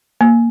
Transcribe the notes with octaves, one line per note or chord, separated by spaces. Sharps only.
A#3